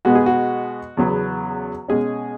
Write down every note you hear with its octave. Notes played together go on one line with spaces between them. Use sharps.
B2 G#3 B3 F#4
G#4
F#4
E2 C#3 F#3 B3
B2 G#3 C#4 G#4